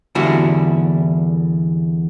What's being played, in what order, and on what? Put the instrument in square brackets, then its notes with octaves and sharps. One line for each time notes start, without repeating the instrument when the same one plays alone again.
[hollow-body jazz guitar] E2 D3 G3 E4 F#4